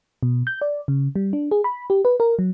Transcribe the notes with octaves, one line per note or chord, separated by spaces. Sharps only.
B2
G6
D5
C#3
G3
D4
G#4
B5
G4
B4
A#4
F#3